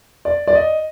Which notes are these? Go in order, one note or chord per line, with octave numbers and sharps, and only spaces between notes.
D5
D5
D#5